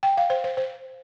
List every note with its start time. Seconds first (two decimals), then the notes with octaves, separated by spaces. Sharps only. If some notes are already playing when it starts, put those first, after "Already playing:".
0.03 G5
0.17 F5
0.30 C5
0.44 C5
0.57 C5